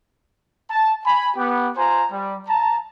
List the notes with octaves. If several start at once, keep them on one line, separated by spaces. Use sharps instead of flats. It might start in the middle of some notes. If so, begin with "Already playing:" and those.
A5
G#5 B5
B3 G4
F4 C5 G#5 A#5
G3
A5 A#5